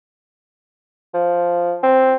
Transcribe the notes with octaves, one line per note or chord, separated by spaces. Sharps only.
F3
C4